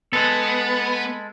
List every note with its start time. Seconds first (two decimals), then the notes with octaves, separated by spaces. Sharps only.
0.13 G#3 B3 A4